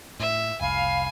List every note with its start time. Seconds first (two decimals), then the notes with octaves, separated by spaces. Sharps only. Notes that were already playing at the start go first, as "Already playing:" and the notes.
0.20 A2 E5
0.61 F1 C2 F5 G#5 B5